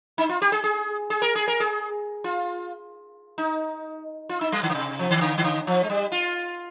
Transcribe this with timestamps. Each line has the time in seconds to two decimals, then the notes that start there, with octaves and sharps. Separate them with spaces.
0.18 D#4
0.29 F4
0.42 G4
0.52 G#4
0.64 G#4
1.10 G#4
1.22 A#4
1.35 G#4
1.48 A#4
1.60 G#4
2.24 F4
3.38 D#4
4.29 F4
4.41 D#4
4.52 G3
4.63 D#3
4.70 D3
4.75 C3
4.99 F3
5.10 D#3
5.21 D3
5.38 D#3
5.44 D3
5.67 F3
5.83 G#3
5.90 G3
6.12 F4